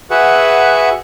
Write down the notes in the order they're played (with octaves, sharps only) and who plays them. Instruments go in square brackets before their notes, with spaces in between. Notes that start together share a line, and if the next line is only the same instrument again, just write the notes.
[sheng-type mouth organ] F#4 G#4 B4 E5 F#5